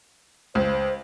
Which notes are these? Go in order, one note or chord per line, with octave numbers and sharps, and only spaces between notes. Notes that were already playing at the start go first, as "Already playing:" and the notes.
C#2 C5